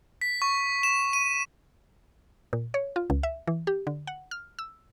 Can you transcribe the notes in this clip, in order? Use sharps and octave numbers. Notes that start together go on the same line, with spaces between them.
B6
C#6
E7
D#7
A#2
C#5
F4
C#2
E5
E3
G4
D3
F#5
F6
E6